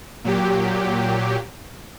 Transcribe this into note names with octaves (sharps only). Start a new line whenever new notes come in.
A#2 F#3 G4